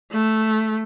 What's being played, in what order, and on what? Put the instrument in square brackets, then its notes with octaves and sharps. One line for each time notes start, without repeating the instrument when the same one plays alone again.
[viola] A3